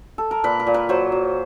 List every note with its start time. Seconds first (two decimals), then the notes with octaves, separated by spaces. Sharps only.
0.18 A4
0.31 A#4
0.44 A#2 B4
0.60 A#4
0.67 A#2
0.74 B4
0.89 F#3 C5
1.12 F#3